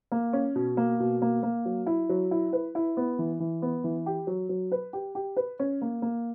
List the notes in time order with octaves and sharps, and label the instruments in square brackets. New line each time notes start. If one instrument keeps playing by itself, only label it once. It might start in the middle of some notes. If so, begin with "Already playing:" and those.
[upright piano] A#3
C#4
B2
A#3
B2
A#3
A#3
F#3
E4
F#3
E4
B4
E4
B3
E3
E3
B3
E3
G4
F#3
F#3
B4
G4
G4
B4
C#4
A#3
A#3